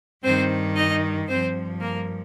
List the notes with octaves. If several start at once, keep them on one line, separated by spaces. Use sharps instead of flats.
G2 D#3 C4 C5
D#4 D#5
G2 F3 C4 C5
A#3 A#4